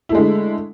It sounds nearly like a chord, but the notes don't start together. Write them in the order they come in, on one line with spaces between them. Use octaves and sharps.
E4 A3 G#3 D3